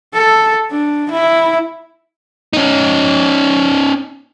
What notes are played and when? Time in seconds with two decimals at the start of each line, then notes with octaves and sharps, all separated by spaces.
0.14 A4
0.71 D4
1.11 E4
2.53 C#4 D#4